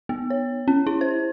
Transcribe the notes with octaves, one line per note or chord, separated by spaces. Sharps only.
B3
C#5
C#4
E4
C5